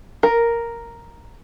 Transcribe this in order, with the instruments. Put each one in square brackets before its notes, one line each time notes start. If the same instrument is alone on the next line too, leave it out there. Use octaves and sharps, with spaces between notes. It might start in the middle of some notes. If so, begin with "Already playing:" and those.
[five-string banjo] A#4